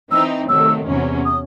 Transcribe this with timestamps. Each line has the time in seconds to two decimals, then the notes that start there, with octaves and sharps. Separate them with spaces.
0.11 E3 C4 D#4 E6
0.49 C3 D#3 F#3 A3 E6
0.87 E2 C3 F#3 C#4
1.25 D#6